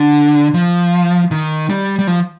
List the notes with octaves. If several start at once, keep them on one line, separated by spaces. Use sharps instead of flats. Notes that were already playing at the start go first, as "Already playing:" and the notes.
Already playing: D3
F3
D#3
G3
G3
F3